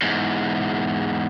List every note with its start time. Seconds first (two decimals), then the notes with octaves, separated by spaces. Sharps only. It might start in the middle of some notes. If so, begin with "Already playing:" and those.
0.02 E2 G#2